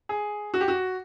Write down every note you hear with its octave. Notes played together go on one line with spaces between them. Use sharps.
G#4
F#4
G4
F#4